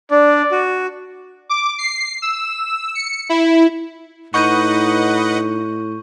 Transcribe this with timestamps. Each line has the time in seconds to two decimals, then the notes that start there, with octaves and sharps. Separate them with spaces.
0.11 D4 D5
0.52 F#4
1.49 D6
1.78 C7
2.22 E6
2.95 C#7
3.29 E4
4.34 A2 D#4 B4 D#5 F#5 C#6 G6 D#7